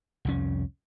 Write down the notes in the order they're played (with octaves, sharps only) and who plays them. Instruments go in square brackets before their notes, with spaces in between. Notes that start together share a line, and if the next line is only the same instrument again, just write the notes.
[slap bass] C2 F2 C#4